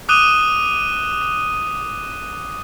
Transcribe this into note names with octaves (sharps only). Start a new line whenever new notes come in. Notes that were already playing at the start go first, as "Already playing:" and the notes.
D6 D#6 F#6 D#7 E7 G7